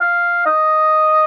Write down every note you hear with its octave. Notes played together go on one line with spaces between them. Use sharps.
F5
D#5